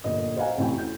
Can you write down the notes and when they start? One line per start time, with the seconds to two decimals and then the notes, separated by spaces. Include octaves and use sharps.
0.04 G1 A#2 D#5 D#6
0.37 C5 D#5 F5 F#5 G#5 A#5
0.57 A1 F2 C3 E4 F#4 G5
0.78 G6